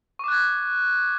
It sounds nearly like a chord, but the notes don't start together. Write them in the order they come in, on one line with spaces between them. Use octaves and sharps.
C#6 D6 F#6 G#6